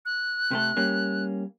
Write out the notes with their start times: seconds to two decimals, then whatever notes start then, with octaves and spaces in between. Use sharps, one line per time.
0.05 F#6
0.51 C3 A3 A4
0.77 G3 A#3 C#4